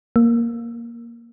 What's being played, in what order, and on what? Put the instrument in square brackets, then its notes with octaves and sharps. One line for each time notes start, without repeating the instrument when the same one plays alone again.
[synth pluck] A#3